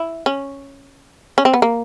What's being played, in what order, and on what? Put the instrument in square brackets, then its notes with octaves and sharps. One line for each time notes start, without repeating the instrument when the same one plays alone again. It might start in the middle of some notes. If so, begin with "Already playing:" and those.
Already playing: [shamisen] E4
C#4
C#4
C4
B3
A#3